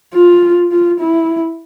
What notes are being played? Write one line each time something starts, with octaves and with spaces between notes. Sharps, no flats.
F4
F4
E4